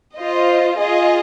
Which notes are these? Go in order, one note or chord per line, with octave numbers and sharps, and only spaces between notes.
F4 C5 D#5
F4 G#4 D#5